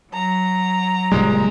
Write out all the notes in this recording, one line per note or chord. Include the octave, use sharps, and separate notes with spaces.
F#3 A#5
F#1 A#2 G3 G#3